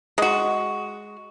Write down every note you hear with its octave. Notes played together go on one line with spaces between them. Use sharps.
G#3 F#4